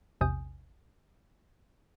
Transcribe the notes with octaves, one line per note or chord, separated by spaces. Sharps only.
A#1 E2 C3 G#5 D#6 G6